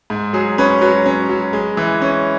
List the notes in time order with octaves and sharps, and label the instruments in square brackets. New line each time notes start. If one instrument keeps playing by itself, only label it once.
[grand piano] G#2
F#3 G#4
C#4 B4
F#3 B4
C#4
F#3
G#3
E3
C#4